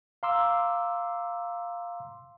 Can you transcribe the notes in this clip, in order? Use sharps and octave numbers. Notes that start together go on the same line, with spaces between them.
F5 A#5 C6 D6 E6